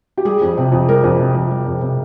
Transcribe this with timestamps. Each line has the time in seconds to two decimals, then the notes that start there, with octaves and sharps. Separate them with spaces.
0.17 G4
0.25 G3 G#4
0.42 F2
0.57 C3
0.72 F2
0.88 G3 A#4
1.04 F2
1.20 C3
1.35 F2
1.51 G3
1.66 F2
1.81 C3